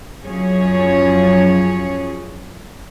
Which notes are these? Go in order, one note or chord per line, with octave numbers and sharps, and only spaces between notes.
F#2 F3 C#4 G#4 C#5